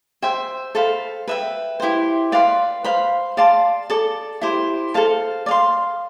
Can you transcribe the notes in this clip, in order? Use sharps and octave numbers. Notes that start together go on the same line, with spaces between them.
C5 E5 G5
A4 C5 F5 B5
B4 E5 G5
E4 G4 C5
B4 D5 F5 C6
C5 F5 B5
D5 F5 A5 C6
A4 D5 A5 D6
E4 G4 C5
A4 C5 F5 A5
D5 F5 C6